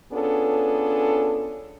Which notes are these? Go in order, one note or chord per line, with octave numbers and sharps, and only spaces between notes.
B3 C#4 D4 F4 G#4 A4